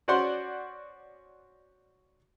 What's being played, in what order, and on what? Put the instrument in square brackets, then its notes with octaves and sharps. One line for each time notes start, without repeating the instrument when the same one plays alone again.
[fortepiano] C#4 F#4 C5 D5 F#5 C6